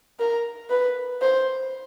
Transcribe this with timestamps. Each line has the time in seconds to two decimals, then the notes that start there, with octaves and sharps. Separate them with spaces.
0.19 A#4
0.70 B4
1.21 C5